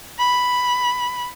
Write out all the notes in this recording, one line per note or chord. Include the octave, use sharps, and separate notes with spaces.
B5